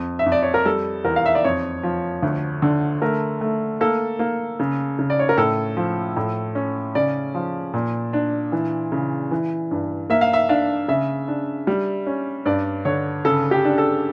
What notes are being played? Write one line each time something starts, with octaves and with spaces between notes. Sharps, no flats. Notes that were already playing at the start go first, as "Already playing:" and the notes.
Already playing: F2
E5
F2
D5
C#5
A#4
G3 A4
E2 A#4
F5
E5
D5
F2 C#5
F3
D2
D3
A3 A#4
A3
A#3 A4
A#3
C#3
C#3
D5
C#5
A#4
A2 A4
F3
A2
C#4
C#3 D5
F3
A#2
D4
E3
C#3
E3
G2
A#3 E5
F5
E5
D4 F5
C#3 E5
D4
G3
C#4
G2 D5
D3 C#5
C#3 A4
G4
D4
A4